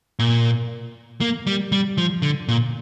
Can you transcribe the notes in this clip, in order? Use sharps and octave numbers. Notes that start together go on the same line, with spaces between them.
A#2
A#3
G3
G3
F3
D3
A#2